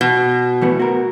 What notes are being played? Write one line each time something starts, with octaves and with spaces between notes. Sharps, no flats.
B2
E3 A3 B3
F#4 A#4